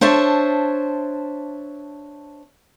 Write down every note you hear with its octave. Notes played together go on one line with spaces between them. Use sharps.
D4 C5 C#5 E5 A5